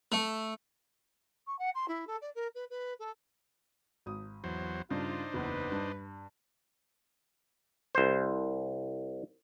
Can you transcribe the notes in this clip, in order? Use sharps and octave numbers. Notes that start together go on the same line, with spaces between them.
A3
C#6
F#5
C6
E4
A4
D5
A#4
B4
B4
A4
G#1 D#6
E2 F#3 C5
G2 C#3 D4 D#4 F4 C5
F#1 E2 B4
G2
C2 C5